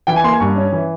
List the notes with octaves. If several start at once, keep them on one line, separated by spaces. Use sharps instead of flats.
E3 G5
G#5
A#3 C6
G#5
G2 C#6
C#4
E3